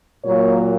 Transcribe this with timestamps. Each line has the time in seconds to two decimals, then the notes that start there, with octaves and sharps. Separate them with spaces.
0.23 A#2 F#3 A#3 C#5